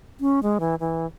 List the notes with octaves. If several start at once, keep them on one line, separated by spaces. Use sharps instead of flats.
C#4
G#3
E3
E3